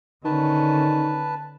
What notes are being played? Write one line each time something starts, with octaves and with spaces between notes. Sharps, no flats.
D3 D#3 C#4 B4 A5